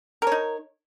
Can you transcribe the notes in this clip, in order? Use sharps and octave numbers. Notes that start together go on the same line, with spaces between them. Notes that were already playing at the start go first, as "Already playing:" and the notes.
D#4 A#4 C#5